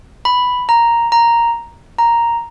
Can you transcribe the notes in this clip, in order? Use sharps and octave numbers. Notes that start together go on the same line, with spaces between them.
B5
A#5
A#5
A#5